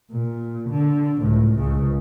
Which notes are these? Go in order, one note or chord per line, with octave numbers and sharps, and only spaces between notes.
A#2
D3
C#2 A2
C#2 C#3